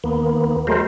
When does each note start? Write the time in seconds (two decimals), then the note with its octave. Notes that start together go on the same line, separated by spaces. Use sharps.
0.04 D#2 A#3 B3
0.67 F#3 G#3 A3 A#4 C5